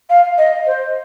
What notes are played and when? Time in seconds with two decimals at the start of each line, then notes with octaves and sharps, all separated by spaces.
0.10 F5
0.38 D#5
0.66 C5